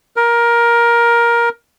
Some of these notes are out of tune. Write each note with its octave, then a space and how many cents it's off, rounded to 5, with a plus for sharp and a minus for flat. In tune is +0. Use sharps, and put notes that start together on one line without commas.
A#4 +15